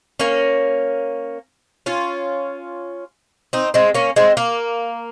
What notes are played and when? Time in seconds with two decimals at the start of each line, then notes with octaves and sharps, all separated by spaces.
0.20 A#3 C#4
1.86 C#4 F4
3.53 C4 D#4
3.74 G#3 C4
3.94 A#3 C#4
4.16 G#3 C4
4.37 A#3